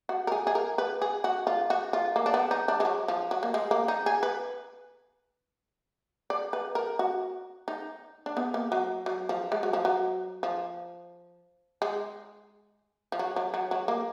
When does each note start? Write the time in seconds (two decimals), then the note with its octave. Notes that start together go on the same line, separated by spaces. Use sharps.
0.09 F#4
0.27 A#4
0.32 G#4
0.47 G#4
0.55 A#4
0.78 B4
1.02 G#4
1.24 F#4
1.47 F4
1.70 F#4
1.93 F4
2.16 A#3
2.26 D4
2.34 B3
2.51 D#4
2.68 D4
2.80 G#3
2.85 F#3
3.08 F3
3.31 F#3
3.43 A#3
3.54 G#3
3.71 A#3
3.88 D#4
4.06 G#4
4.23 B4
6.30 D5
6.53 B4
6.75 A#4
6.99 F#4
7.68 D#4
8.26 D4
8.37 B3
8.54 A#3
8.72 F#3
9.06 F#3
9.29 F3
9.52 G#3
9.63 F#3
9.73 F3
9.85 F#3
10.43 F3
11.82 G#3
13.12 F3
13.19 F#3
13.36 F#3
13.54 F#3
13.71 F#3
13.88 A#3